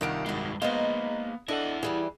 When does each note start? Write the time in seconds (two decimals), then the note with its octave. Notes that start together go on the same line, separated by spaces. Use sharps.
0.01 C2 G2 D#3 F4 F#5 D7
0.26 G2 G#3 E4 F#4
0.62 G#3 A#3 B3 D#4 C5 D#5 F5
1.48 D4 E4 A4 D#5 F#5
1.83 E3 G3 G4 G#4